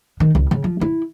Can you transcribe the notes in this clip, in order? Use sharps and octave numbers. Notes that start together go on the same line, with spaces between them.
D#3
C#2
C#3
F3
E4